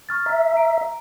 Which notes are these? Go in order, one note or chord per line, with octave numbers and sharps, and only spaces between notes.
C#6 F6 A6
E5 A#5
A#5 D7